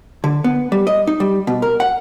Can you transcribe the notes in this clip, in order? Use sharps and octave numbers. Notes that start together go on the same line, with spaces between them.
D3
B3
G3
D#5
D#4
G3
B2
A#4
F#5